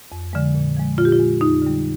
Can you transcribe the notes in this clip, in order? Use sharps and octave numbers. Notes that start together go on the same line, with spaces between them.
F2
D3 F3 G#3
A#2
F3 G#3
A#2 F4
G4
F4
G#3
F2 D#4
D3 G3